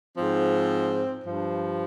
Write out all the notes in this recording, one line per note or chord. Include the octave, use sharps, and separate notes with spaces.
G#2 F3 C4
G2 F3